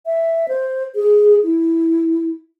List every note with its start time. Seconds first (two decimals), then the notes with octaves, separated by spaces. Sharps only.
0.06 E5
0.48 C5
0.95 G#4
1.43 E4